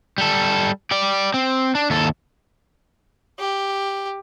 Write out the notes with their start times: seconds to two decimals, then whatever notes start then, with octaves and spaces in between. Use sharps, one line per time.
0.18 G3 A4
0.91 G4 D5
1.34 C4
1.75 D4
1.90 D#2 A4
3.40 G4